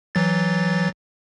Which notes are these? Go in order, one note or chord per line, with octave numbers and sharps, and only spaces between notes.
E3 F#3 A6